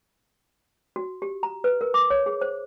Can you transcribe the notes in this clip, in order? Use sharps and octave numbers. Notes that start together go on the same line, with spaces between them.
F#4
G4
A#5
B4
A#4
D6
C#5
G#4
C5